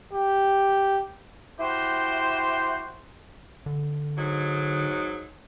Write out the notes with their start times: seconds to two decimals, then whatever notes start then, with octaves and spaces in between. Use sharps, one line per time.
0.13 G4
1.60 E4 F#4 G4 C5
3.66 D3
4.17 G#2 F#3 D#4